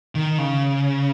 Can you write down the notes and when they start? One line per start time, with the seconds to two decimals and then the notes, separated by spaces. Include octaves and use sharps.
0.15 D#3
0.38 C#3